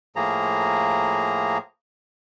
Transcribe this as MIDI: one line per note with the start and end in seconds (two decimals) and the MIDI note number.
0.16 1.58 45
0.16 1.58 53
0.16 1.58 58
0.16 1.58 68
0.16 1.58 82